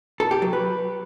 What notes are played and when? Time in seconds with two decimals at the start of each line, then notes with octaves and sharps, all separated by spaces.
0.20 A4
0.31 G4
0.42 F#3
0.53 B4